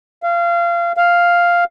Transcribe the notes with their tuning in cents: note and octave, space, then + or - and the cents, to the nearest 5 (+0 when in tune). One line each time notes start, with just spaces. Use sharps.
F5 -25
F5 +0